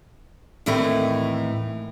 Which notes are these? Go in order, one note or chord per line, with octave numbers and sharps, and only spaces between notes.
D#2 A2 E3 A3 C4 E4